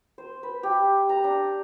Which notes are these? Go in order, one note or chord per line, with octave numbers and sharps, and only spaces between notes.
C5
B4
G4
A#5
D4